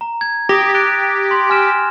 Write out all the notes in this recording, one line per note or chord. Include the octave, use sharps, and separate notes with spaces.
A#5
G#6
G4 D6 D#6 A#6
G4 F#6 A6 D7
C6
G#5 F6 E7